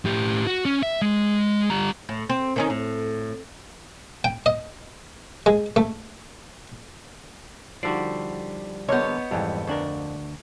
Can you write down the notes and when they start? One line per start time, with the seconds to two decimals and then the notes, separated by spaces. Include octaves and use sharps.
0.05 A2 G4
0.47 F#4
0.65 C#4
0.83 E5
1.02 G#3
1.70 G3 A#5
2.09 A2
2.29 C4
2.56 D#3 C#4 D#4
2.70 A2
4.24 G5
4.46 D#5
5.46 G#3
5.76 A3
7.83 D3 F3 G3 D#4 F#4 D5 C7
8.89 D3 A#3 B3 C#5 D#5 G6
9.31 F2 G#2 E3 G3
9.67 D2 D4 A#4